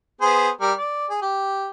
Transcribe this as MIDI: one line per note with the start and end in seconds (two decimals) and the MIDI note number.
0.21 0.49 59
0.21 0.49 68
0.21 0.49 72
0.61 0.72 55
0.61 0.72 70
0.77 1.07 74
1.10 1.19 68
1.22 1.68 67